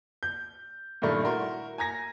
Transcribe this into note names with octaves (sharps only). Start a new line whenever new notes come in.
G6
G2 A#2 D#3 A3 A#3
E4 F#4 A#4 C6
G#5 A#5 G#6 A#6